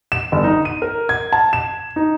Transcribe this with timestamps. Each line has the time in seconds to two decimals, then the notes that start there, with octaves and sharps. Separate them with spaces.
0.12 E7
0.32 G1
0.44 D#4
0.65 D#7
0.82 A#4
1.09 G#6
1.33 A5
1.53 E7
1.96 D#4